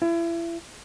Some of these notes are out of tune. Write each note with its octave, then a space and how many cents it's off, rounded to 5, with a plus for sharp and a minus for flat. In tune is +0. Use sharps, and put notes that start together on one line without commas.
E4 +35